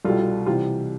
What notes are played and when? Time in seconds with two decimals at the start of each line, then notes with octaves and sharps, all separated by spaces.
0.05 C2 B2 G3 F4 A4
0.46 C3 E3 G3 F4